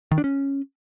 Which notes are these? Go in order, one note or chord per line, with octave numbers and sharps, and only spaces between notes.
D#3
D4
C#4